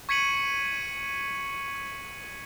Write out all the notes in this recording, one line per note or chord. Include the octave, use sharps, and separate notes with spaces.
C#6 G#6 B6 C#7 D#7 F#7